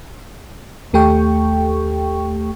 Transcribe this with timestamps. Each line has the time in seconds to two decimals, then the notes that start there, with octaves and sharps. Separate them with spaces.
0.93 D#2 A3 G4 A4 G5 C#6